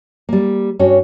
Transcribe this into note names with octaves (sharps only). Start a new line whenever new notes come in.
G3 A#3
G2 C#4 F#4 C#5